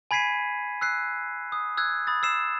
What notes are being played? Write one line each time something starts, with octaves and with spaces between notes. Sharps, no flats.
G#5 B5 G#6 B6 C7 D#7
E6 F#6 C7
D#6
E6 F#6 G#6
B5 D#6 A6
E6 C7 E7